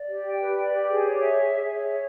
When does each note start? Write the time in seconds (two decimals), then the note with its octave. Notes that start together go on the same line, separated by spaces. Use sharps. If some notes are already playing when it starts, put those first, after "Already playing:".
Already playing: D5
0.08 G4
0.24 G5
0.40 B4
0.57 D5
0.74 G4
0.88 G#4
1.05 C#5
1.21 E5
1.38 G#4
1.54 G#4
1.69 C#5
1.85 E5